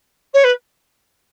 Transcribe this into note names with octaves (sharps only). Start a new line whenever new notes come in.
C#5
B4